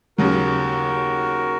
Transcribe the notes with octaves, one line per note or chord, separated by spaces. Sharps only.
D#2 C#3 F#3 F#4 A#4